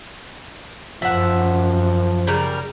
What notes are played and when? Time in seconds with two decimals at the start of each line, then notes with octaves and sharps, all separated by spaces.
1.02 F#2 F3 E5 F#5
2.27 C#3 G3 A#4